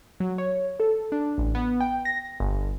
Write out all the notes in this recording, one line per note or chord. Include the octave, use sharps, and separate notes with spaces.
F#3
C#5
A4
D4
A1
B3
G5
A#6
G1